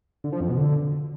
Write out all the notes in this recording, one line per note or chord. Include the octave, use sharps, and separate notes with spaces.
D3
F3
F2
B2
D3